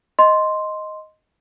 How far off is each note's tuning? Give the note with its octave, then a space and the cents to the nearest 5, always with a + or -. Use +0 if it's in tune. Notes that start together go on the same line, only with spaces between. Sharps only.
D#5 +5 C6 +0